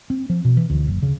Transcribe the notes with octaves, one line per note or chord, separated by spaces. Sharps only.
C4
F3
B2
E3
D2
F#1
C#3